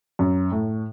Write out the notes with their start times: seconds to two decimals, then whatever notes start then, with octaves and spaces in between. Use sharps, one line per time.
0.19 F#2
0.52 A2